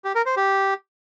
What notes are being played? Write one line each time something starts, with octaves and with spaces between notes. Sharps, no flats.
G4
A#4
C5
G4